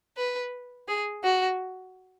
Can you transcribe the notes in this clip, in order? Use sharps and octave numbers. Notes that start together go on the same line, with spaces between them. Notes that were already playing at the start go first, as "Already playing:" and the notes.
B4
G#4
F#4